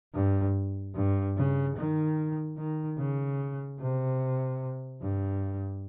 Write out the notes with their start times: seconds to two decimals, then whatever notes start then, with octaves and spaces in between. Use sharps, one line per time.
0.14 G2
0.95 G2
1.37 C#3
1.77 D#3
2.58 D#3
2.98 C#3
3.80 C3
5.01 G2